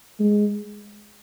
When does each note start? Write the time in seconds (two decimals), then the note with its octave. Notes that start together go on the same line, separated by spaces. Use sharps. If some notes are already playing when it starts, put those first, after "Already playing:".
0.20 G#3